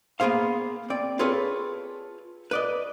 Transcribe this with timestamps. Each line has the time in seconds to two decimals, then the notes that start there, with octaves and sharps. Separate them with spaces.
0.20 A#3 B3 G#4 C5 F5
0.90 C4 D5
1.19 F4 G#4 A4 B4 C#5
2.51 B4 D5 D#5